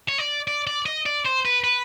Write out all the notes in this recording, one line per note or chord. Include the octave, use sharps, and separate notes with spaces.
C#5
D5
D5
D5
D#5
D5
C5
B4
B4